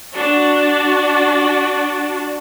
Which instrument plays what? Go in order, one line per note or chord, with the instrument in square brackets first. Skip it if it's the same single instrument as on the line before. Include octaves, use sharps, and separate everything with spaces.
[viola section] D4 F#4